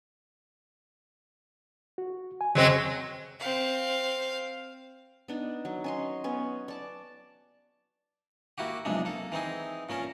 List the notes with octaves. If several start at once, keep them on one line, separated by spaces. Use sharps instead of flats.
F#4
G#5
F2 C#3 F#3 G#3 C4
C4 F5
B3 D4 D#4
F#3
C#4 D#5 C6
B3 C#4
D5 A5
A#3 E4 F#4 G4
B1 F2 C3 G#3 D4
A#3 A4
E3 C4 D#4 G#4
A#2 C#4 A#4 A5